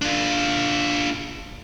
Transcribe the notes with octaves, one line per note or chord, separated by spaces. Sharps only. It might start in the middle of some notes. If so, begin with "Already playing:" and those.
D4 F4